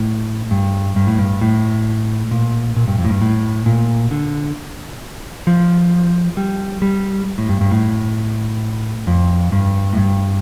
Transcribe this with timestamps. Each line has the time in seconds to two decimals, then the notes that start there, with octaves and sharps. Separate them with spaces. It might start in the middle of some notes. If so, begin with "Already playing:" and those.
Already playing: A2
0.51 G2
0.96 G2
1.07 A2
1.18 G2
1.41 A2
2.31 A#2
2.76 A#2
2.88 G2
2.98 F2
3.05 A2
3.09 G2
3.22 A2
3.66 A#2
4.11 D3
5.47 F3
6.37 G3
6.82 G3
7.38 A2
7.49 G2
7.61 G2
7.71 A2
9.07 F2
9.52 G2
9.93 A2
9.97 G2